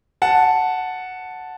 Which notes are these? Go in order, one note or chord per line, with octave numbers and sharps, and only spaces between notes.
F#5 A5